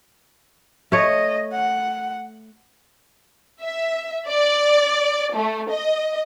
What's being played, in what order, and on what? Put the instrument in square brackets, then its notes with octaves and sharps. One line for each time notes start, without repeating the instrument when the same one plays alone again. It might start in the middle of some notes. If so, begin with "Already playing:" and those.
[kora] A3 C#5 [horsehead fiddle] D#5
[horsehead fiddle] F#5
[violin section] E5
D5
A3
D#5